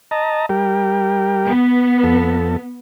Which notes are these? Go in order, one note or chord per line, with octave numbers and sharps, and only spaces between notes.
D#5 A5 A#5
G3 G4 A#4
B3
F2 A4